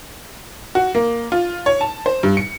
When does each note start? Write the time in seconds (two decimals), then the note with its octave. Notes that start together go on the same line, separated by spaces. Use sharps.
0.75 F#4
0.95 A#3
1.32 F4
1.66 C#5
1.81 A5
2.06 C5
2.23 G2
2.37 C#7